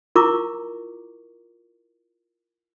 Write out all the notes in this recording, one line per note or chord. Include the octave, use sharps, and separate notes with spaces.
E4 F4 A#4 A#5 C#6 D6